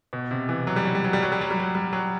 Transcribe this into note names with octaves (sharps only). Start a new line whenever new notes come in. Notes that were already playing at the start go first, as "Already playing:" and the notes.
B2
C3
E3
F#3
G3
F#3
G3
F#3
G3
F#3
G3
F#3
G3
F#3
G3
F#3